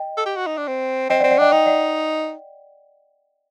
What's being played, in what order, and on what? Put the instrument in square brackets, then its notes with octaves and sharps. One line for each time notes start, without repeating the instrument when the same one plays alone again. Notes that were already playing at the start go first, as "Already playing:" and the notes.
Already playing: [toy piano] D#5 G5
[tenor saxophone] A4
G4
F#4
D#4
D4
C4
[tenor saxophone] C4 [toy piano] D#5 G5
[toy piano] D5 F#5
[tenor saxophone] C4
[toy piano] D5 F#5
[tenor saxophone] D4 [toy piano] D#5 G5
[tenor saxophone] D#4 [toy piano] D#5 G5
[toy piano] D5 F#5